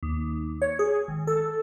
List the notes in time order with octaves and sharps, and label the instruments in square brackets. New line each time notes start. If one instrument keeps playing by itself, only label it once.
[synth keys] D#2
C#5
G#4
G#1
A4